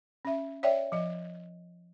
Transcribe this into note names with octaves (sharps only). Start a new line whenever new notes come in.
C#4 E5
C#5 D5 E5 G5
F3 D#5